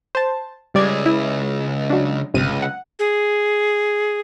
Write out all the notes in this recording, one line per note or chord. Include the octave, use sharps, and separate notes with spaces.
C5 A5
C#2 G3 G#4 D5 G#6
E4
F#3 D4
G1 C#2 C3 D#7
F#5
G#4